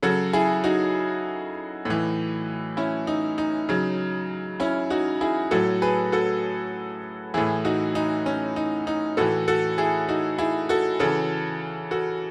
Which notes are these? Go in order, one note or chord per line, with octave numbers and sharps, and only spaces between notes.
C#3 F#3 F#4 A4
E4 G#4
D#4 F#4
A2 E3
C#4 E4
D#4
D#4
C#3 F#3
C#4 E4
D#4 F#4
E4 G#4
A2 F#3 F#4 A4
G#4 B4
F#4 A4
A2 E3 E4 G#4
D#4 F#4
D#4
C#4
D#4
D#4
A2 E3 F#4 A4
F#4 A4
E4 G#4
D#4 F#4
E4 G#4
F#4 A4
C#3 E3 F#4 A4
F#4 A4